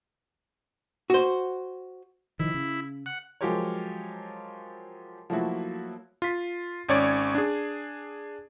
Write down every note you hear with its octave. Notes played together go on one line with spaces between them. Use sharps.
F#4 C5
D#3 F3 E4
C#3
F#5
F3 F#3 G#3 G4 A#4 C#5
F3 F#3 A3 A#3 E4 F#4
F4 B6
G#1 C#4 C#5 D5 G#6
D4 G#4